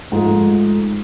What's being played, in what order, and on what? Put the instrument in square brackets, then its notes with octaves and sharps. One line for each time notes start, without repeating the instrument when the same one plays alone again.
[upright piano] G#2 F3 A3